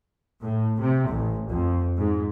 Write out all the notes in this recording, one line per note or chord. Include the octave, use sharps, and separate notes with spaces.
A2
C3
A1
F2
G#2